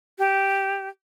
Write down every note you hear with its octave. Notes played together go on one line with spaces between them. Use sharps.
G4